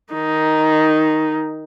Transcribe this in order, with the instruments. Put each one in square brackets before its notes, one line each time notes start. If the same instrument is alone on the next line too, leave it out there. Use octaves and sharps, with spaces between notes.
[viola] D#3 D#4